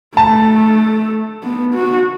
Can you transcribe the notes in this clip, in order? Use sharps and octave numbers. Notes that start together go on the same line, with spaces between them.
A3 A5
B3
F#4